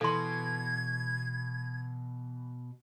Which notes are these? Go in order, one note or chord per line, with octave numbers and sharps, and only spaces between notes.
B2 E3 A4 C6 G#6